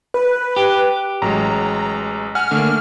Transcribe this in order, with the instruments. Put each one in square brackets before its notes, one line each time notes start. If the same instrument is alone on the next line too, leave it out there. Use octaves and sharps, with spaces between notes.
[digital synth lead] B4
[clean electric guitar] G4
[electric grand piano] A1 F#3 G#3 [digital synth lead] A#5
[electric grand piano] F#5 G#5 [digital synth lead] F6
[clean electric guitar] D3 A#3 [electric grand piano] A3